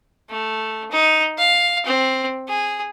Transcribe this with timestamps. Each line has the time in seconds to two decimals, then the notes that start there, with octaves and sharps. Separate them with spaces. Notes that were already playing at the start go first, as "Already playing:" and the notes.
0.30 A3
0.91 D#4
1.38 F5
1.86 C4
2.48 G#4